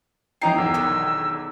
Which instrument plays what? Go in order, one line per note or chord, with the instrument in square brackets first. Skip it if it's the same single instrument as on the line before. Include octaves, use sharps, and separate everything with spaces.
[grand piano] E3 D#4 C7 [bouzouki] G5 [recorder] A#5
[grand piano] B1 E2 [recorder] E6
[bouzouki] D3 D#3